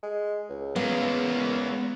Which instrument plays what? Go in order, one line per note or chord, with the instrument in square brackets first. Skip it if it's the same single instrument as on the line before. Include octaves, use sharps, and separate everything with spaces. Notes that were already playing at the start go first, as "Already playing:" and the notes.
[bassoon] G#3
C#2
[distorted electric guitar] E2 [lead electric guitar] G#3 C#4 [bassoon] A#3 [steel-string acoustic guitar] B3